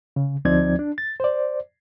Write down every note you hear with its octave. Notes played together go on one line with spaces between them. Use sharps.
C#3
D2 F3 C4 D#4 D5 G#6
D4
A6
C5 D5